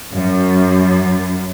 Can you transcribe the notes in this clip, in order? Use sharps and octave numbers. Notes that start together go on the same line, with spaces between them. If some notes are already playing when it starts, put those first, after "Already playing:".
F#2